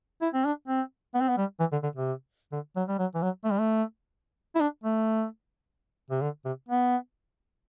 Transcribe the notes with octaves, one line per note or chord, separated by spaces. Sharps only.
E4
C4
D4
C4
B3
C4
B3
G3
E3
D3
D3
C3
D3
F#3
G3
F#3
E3
F#3
A3
G3
A3
E4
D4
A3
C3
D3
C3
B3